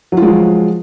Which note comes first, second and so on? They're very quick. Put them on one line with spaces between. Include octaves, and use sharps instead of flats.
F#3 F4 G#3 F3